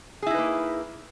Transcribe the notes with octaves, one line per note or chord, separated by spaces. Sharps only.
A#3 D#4 E4 G#4 B4